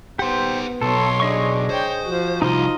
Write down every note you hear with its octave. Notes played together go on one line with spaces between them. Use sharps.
B3 D#4 G4 C5 F#5
B1 A4 C#5 C6
D4 G#4 D#5 C#6
C5 C#5 G5
F3 F#4
C2 D#4 F4 D#5